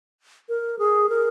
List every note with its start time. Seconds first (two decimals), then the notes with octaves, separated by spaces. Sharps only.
0.49 A#4
0.79 G#4
1.09 A#4